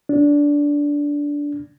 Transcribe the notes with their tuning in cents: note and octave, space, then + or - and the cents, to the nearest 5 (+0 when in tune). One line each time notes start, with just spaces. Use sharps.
D4 -15